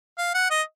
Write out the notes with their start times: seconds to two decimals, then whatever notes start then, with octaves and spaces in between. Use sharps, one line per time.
0.18 F5
0.34 F#5
0.50 D#5